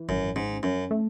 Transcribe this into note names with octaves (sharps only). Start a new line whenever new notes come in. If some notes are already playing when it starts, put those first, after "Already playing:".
Already playing: E3
G#1 F#2
G#2 C#4
F#2 C#4
A3